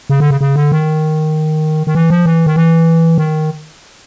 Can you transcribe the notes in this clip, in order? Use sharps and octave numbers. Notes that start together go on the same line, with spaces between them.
C#3
D3
C#3
C#3
D3
D#3
D#3
E3
F3
E3
D#3
E3
D#3